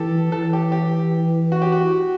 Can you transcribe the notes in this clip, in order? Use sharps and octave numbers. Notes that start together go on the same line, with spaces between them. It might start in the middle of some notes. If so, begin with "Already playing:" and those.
Already playing: E3 G4 A4
E3 A4
G4
G4
F#4
G4
F#4